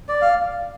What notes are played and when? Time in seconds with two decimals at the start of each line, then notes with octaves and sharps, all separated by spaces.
0.09 D5
0.21 F5